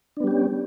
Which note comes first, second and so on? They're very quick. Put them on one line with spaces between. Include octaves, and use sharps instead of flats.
D4 B3 G3 G4 C#4